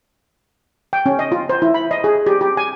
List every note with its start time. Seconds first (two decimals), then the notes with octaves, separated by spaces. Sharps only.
0.93 G5
1.06 C#4
1.19 D#5
1.32 F4
1.49 C5
1.62 E4
1.74 B5
1.91 D#5
2.04 G#4
2.27 G4
2.41 G4
2.57 G#5